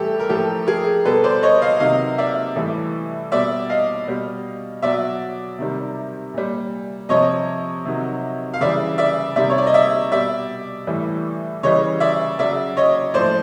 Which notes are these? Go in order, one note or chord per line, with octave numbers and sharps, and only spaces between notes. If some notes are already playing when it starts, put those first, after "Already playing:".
Already playing: A2 E3 G3 G4 A4
A#4
A2 F3 G4 A4
G#4 A#4
B2 G3 A4 B4
C5 D5
C#5 D#5
D#5 F5
C3 D#3 F#3 D#5 F5
D5 E5
A2 E3 G3
B2 G3 D5 E5
D#5 F5
B2 G3
B2 F#3 D5 E5
C3 D#3 G3
A#2 G3
C3 F3 C#5 D#5
C3 D#3 F#3
F5
C#3 E3 G3 D5 E5
D5 E5
C3 D#3 G3 D5 E5
C#5
D5
D#5
D5 E5
B2 G3 D5 E5
A2 E3 G3
C#3 E3 G3 C#5 D#5
D5 E5
C#3 F#3 D5 E5
C#5 D#5
A2 F3 C5 D5